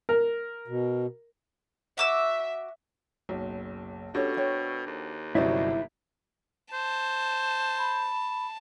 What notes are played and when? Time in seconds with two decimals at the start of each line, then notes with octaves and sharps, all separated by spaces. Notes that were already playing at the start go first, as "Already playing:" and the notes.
0.09 A#4
0.68 B2
1.98 F#4 E5 D6 E6
3.29 F#1 B1
4.14 B2 C#4 D4 F#4 G4 A4 C#5
4.37 C5 C#5 G5
4.87 D#2
5.35 G1 C3 F#3 C#4 E4 D5 D#5
6.73 C5 A5
7.79 B5